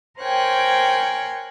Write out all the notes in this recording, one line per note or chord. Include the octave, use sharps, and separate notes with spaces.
A#4 C5 C#5 G5 G#5 F#6